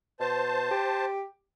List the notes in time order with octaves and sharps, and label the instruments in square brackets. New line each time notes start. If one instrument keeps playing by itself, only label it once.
[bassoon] B2 [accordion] C5 A5
[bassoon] G4